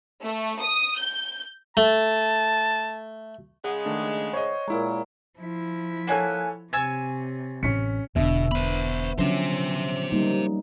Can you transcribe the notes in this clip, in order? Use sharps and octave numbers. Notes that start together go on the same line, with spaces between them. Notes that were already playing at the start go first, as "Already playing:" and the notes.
A3
D#6
G6
A3 A5
C#3 G#3 F#5
D#3 A3 D4
C5 C#5 D#5
A#2 G#3 E4 A#5
F3 E4
A#3 A4 C#5 F#5 G#5 F#6
C3 C#5 G#5 E6 G#6 A6
A1 C#4 B6 C#7
E1 B2 D3 E5
B3 C5 B5
D3 F3 F#3 C#4 C5 E5
G3 A#3 D#4